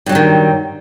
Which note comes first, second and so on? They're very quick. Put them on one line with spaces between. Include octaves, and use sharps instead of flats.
G2 F#3 G3 D#3